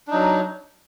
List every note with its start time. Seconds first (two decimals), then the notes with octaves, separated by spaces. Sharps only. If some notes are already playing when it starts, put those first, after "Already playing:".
0.07 D4
0.10 D#4
0.13 F#3